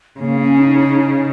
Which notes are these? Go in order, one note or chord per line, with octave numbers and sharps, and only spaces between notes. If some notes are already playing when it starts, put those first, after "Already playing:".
C#3 A#3
C#4
D#4
D#4
D#4